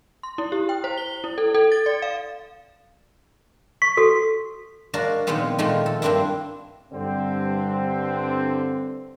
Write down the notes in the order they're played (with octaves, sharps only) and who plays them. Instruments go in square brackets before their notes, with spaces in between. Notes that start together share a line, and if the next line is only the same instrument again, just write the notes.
[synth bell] C6
E4
G4
G5
C5
G7
E4
A4
A4
A6
D5
F5
[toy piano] C#6 [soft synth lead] B6
[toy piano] F#4 A4
[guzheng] G#3 A#3 D4 F#4 A#4 D5
A#2 D#3 F3 G#3 B3 C4
A#2 D#3 F3 G#3 A3
A4
G2 A#3 C4 D4 E4
[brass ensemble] G2 D3 C4